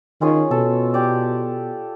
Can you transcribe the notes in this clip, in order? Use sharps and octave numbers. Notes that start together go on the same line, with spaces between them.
D#3 C#4 F4 G#4
B2 A4
G4 D5